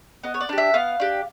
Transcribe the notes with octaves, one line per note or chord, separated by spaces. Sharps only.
B3 D#5
C#5
D5
D4 G4
E5
B3 F5
D4 G4